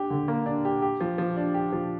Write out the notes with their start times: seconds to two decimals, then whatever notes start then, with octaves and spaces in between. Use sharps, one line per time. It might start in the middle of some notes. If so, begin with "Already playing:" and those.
Already playing: D4 G4
0.10 D3
0.28 A#3
0.46 D4
0.65 G4
0.82 G4
1.00 F3
1.18 F3
1.37 D4
1.54 G4
1.72 F3